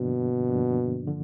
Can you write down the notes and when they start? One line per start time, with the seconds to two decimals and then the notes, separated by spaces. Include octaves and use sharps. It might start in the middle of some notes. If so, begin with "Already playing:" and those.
Already playing: G2 B2 D3 F3 A#3 D4
0.48 G2 D3 F3 A#3 D4
1.08 D3 F3